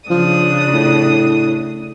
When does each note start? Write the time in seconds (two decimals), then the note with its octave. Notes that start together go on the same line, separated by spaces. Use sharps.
0.10 C#3 F3 D4 D#6
0.73 A2